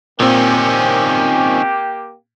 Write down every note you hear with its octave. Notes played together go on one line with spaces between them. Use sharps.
A#2 D#3 A#3 C4 C#4 G4